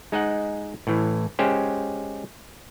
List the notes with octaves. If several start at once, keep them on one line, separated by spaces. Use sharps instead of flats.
G#3 D#4 D#5 F#5
A2 E3
G#3 C#4 G4 C5